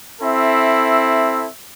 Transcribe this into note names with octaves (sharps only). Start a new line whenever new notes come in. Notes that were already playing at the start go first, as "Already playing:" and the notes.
C4 E4 A4 E5